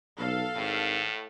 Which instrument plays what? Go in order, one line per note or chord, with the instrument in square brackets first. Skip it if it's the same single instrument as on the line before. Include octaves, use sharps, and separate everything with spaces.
[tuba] B1 [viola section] A4 F5
[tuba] G#1 [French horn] A2